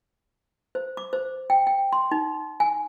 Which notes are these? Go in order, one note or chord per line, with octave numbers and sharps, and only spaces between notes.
C5
D6
C5
G5
G5
C6
D#4
G#5